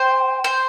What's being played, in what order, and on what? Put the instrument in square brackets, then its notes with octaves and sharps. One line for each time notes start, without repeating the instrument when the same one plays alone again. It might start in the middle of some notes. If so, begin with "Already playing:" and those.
Already playing: [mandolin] C5 [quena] G5
[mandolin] C5